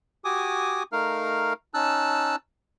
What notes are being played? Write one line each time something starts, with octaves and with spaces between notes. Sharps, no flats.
F#4 G4 G#5 D6 D#6
A3 D#4 A#4 F5 F6
C#4 D#4 A5 E6 F#6